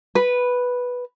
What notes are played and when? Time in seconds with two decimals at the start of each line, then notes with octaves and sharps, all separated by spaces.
0.15 B4